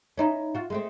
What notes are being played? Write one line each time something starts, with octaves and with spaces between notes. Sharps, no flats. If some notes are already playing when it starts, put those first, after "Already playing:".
C#4 D#4 E4
F4 F#4
G#3 A3 C4